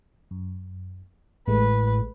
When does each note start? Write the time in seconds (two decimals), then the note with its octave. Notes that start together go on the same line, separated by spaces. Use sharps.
0.31 F#2
1.47 A1 A2 G#3 A3 B4